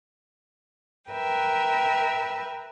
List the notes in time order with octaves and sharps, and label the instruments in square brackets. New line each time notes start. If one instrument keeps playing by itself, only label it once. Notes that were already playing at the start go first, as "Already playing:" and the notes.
[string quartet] A#4 B4 E5 G5